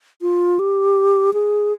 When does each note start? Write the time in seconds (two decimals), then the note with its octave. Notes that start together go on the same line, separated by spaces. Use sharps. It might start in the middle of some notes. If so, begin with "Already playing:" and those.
0.22 F4
0.59 G4
1.34 G#4